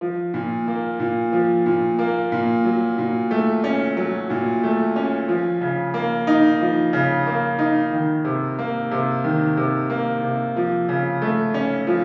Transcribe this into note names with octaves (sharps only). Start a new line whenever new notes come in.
F3
A#2
A#3
A#2
F3
A#2
A#3
A#2
F#3
A#2
A3
C#4
F#3
A#2
A3
C#4
F3
C#3
A#3
D#4
F3
C#3
A#3
D#4
D#3
C3
A#3
C3
D#3
C3
A#3
C3
F3
C#3
A3
C#4
F3